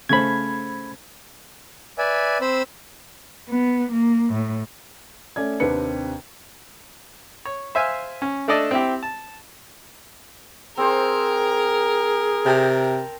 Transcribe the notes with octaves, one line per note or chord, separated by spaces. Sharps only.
C#3 A3 C5 B5 G#6
B4 D5 E5 G#5
C4 C5 B5 E6
B3
A#3
A2
A3 C#4 D5 G#6
D#2 C3 C4 D4 B4 C#7
C#5
C5 E5 F5 G#5
C#4
A3 D4 A4 D5 D#5 A5
C4 E4 G4
A5
C4 G#4 A#4 C5
C3 G5 A5 A#5